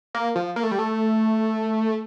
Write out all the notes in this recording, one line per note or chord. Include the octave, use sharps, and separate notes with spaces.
A#3
F3
A#3
A3
G3
A3